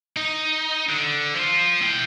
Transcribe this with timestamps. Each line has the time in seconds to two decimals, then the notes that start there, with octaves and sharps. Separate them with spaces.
0.16 D#4
0.89 D3
1.35 F3 F4
1.82 E4 G5